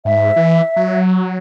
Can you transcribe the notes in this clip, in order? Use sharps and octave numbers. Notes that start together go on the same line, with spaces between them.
G#2 E5
E3
F#3